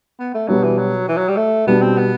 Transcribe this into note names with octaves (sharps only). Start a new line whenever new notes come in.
B3
A3
B2 F#3 G3 B3 D4
E3
F#3
E3
F#3
G3
A3
B2 G3 B3 D4
C4
B3